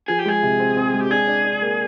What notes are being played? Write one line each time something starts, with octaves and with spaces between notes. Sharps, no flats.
F3 G#4
G4
G#3 G#4
C3
C4
C4
G#3
G4
D4 G#4
D4
D4
A#3